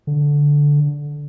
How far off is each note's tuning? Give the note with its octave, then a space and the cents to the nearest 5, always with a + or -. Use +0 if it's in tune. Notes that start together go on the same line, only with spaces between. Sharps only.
D3 -10